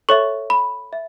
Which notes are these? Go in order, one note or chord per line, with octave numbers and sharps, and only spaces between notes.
A4 C#5 E5 C#6
B5
E5